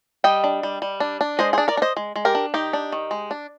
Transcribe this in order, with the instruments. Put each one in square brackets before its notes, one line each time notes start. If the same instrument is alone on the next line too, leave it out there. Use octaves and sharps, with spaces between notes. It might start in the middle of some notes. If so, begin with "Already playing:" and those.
[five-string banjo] G3 D#5 G5
D4
G3
G3
D4
D4
G#3 C5 D#5
G#4 C5
D4
A#4 D5
D4
C5 D#5
G#3
G#3
G4 A#4
D4
D#3 D#4 G4
D4
D#3
G#3
D4